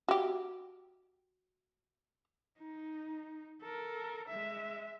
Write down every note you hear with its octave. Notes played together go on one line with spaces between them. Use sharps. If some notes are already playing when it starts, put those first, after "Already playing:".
F#4 G4
D#4
A4 A#4
G#3 E5